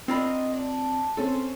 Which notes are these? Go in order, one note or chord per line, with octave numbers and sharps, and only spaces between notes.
C4 D4 F4 A#4 D#5 B5
D4
C4 C#4 A4 C5